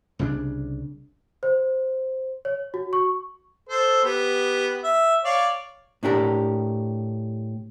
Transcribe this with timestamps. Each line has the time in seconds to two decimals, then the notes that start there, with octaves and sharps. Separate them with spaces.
0.19 C2 C#3 C#4 D4
1.43 C5
2.45 C#5
2.74 F#4
2.93 C#6
3.69 A4 C5
4.04 B3 G4
4.84 E5
5.25 C#5 D5 F5
6.03 A2 D4 G4 A#4